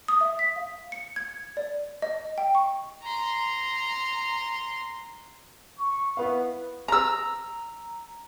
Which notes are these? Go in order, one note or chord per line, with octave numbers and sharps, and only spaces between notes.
D#6
E5
B6
F5
C#7
G#6
D5
D#5
G5
C#6
A#5 C6
C#6
B3 E4 B4 F5
A#5 E6